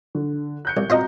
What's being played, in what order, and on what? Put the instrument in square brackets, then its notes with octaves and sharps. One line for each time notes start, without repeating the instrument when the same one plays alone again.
[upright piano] D3
F#6 G6 C#7
[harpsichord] C2
[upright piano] C4 F#4 A#5 [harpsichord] F4 C5 D#5